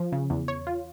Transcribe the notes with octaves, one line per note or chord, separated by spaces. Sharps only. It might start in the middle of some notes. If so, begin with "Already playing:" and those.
Already playing: F3
C#3
E2
C#5
F4